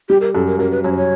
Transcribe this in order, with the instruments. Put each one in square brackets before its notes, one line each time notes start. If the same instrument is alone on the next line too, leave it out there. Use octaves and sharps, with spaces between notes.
[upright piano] G3 [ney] G4
[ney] A#4
[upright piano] F#2 [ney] A4
[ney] A#4
[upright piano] F#2 [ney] A#4
[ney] B4
[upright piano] F#2 [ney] C#5
[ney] C5
C#5